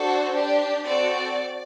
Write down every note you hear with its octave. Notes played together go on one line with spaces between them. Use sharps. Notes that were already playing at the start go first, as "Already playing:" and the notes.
Already playing: D4 F#4 A4 C5
D4 G4
C4 F#4 A4 D5